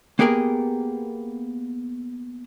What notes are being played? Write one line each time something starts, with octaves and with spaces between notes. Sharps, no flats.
A#3 B3 G4 G#4 A#4